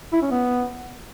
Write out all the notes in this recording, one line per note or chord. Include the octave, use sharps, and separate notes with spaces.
E4
C#4
B3